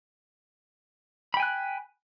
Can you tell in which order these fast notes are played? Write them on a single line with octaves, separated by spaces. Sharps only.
B5 G5 G#5 F#6